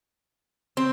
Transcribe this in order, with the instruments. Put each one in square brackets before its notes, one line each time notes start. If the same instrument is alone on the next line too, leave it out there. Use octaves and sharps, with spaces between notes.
[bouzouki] C4